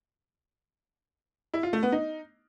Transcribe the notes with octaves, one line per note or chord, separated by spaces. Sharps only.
E4
F4
A3
B3
D#4